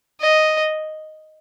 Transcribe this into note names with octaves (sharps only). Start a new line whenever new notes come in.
D#5